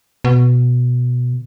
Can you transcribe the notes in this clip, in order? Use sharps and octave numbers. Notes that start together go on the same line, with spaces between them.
B2